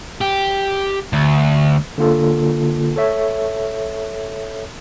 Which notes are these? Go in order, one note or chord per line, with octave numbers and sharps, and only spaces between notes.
G4
D2
D3 A#3 F4 A4
A4 C#5 E5